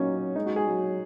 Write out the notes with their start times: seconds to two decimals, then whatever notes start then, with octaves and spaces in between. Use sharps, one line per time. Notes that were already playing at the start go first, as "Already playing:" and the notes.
Already playing: F#3 A#3 C#4 D#4
0.36 G#3 D#4
0.46 F#4
0.56 G#4
0.67 F#3